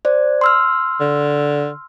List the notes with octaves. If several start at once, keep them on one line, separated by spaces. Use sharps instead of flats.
C5 D5
C6 E6 F6
D3